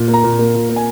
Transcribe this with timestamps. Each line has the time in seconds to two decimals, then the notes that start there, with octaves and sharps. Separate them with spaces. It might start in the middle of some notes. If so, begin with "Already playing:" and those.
Already playing: A#2
0.08 A#3
0.14 A#5
0.23 A#2
0.39 A#3
0.55 A#2
0.69 A#3
0.76 G#5